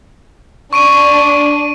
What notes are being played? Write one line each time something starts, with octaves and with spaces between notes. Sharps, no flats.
D4 C#6 D7 D#7